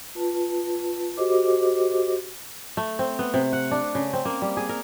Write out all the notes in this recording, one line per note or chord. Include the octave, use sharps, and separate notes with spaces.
F4 B4 A5
F#4 G4 A4 C5 D#5 D6
A3
C4
B3
C3
F#5
D4
C#3
C4
A#3
G3
G#4
A#4